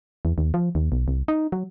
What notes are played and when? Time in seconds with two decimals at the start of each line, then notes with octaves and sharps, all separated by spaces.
0.25 E2
0.38 D#2
0.54 F3
0.75 D#2
0.92 B1
1.08 C2
1.28 D#4
1.52 F#3